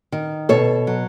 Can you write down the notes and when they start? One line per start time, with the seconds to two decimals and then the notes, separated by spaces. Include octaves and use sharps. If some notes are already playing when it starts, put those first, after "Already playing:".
0.12 D#3
0.49 B2 A4 C#5
0.87 F#3